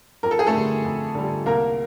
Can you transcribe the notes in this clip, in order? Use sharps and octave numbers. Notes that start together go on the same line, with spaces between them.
F2 A#4
A4
G#4
A3 A4
D3 G3
F2
D3 G3
C2 A#3 A#4